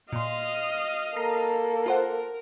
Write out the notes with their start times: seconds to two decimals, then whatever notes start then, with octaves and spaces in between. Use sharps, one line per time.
0.12 A#2 D#5 F5 C6
1.16 A#3 A4 A#5 C7
1.86 F4 A#4 C5 F#5